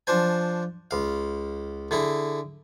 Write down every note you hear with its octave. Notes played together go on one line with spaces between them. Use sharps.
F3 D4 C5 G#5
C#2 F5
D3 E4 G#4